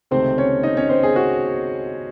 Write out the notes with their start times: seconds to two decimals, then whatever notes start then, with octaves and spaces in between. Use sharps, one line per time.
0.11 C#2 C3 D#3 A3 C4 C5
0.38 C#4 C#5
0.63 D#4 D#5
0.77 C#4 C#5
0.89 C4 C5
1.03 G#4
1.16 F#4